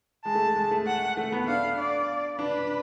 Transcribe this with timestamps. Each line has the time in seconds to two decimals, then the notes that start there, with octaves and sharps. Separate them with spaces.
0.25 G#3 A5
0.35 A3
0.56 G#3
0.71 A3
0.87 F#5
1.17 A3
1.32 B3
1.48 D4 F5
1.79 D5
2.39 D4 B4